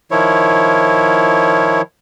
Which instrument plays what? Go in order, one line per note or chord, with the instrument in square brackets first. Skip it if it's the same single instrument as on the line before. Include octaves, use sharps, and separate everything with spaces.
[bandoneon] D#3 F3 E4 C#5